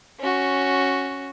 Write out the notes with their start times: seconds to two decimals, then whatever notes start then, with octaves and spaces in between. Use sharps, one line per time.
0.19 C#4 F#4